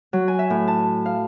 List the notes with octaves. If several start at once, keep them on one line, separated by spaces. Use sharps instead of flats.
F#3
G#5
E5
A2
A5
F5